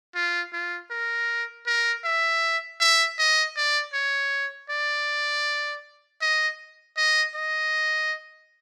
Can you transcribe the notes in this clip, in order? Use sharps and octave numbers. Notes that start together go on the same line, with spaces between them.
F4
F4
A#4
A#4
E5
E5
D#5
D5
C#5
D5
D#5
D#5
D#5